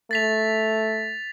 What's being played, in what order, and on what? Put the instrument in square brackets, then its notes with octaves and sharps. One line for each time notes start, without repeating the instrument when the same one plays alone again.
[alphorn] A3 [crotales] A6 B6 F7